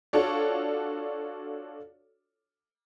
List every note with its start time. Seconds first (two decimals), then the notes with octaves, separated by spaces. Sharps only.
0.13 D4 F4 F#4 A4 C#5 D5